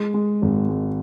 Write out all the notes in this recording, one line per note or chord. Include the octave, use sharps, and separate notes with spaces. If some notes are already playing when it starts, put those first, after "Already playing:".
Already playing: G#3
G#3
G#1
G#3